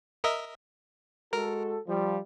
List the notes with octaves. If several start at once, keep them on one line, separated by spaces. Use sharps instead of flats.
A#4 D#5 E5
G#3 F#4 A4 A#4
F3 G3